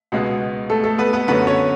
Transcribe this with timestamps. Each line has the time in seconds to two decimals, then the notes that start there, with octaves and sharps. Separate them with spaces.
0.12 C#2 B2 G#3 B3 F#4
0.70 A3 A4
0.84 A3 A4
0.98 B3 B4
1.13 B3 B4
1.28 F#2 D3 A3 B3 C#4 B4
1.47 C#4 C#5